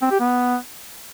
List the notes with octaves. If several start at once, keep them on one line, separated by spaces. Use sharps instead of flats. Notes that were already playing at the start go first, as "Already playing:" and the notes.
C4
G4
B3